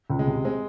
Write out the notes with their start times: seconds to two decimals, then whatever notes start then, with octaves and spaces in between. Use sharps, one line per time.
0.10 C#2
0.19 G#3
0.27 C3
0.45 G#3 C4